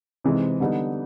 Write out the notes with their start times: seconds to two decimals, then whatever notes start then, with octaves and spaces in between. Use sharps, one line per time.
0.24 C3 E3 G#3 C4 D#4
0.60 D3 G3 B3 D#4